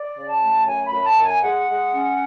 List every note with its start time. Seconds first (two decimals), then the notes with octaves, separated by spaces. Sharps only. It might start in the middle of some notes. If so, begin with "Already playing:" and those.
Already playing: D5
0.16 C#3
0.28 A5
0.41 A3
0.67 F#2 G#5
0.86 B5
0.92 F#2
1.05 A5
1.17 F#2
1.24 G#5
1.42 G#3 F#5
1.68 G#3
1.93 C#4